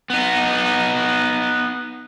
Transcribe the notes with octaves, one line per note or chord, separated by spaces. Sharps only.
B3 D#4